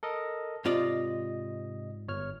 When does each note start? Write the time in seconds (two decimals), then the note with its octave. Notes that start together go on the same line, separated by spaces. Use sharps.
0.03 A4 A#4 D#5
0.65 G#2 C3 F4 D5 D#5
2.08 G1 C#5 F6